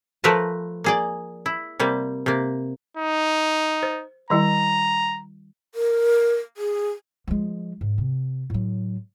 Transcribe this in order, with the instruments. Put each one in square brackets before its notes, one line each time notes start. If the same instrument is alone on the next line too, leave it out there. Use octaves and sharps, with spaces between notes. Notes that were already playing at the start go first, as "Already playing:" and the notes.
[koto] F3 A3 A#4 B4 A5
A#3 G#4 D5
E4
C3 G3 A#3
C3 A#3
[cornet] D#4
[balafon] C5
[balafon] D#3 G3 E4 [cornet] A#5
[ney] A#4
G#4
[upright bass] F3 G#3
G#2
C3
A2 F#3